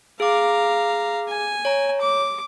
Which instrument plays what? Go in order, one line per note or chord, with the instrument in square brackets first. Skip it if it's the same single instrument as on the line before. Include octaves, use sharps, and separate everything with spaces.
[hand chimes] G#4 D6 [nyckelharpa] F5 A#5
[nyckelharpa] G#5
[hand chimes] C#5 A#5
[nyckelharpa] D6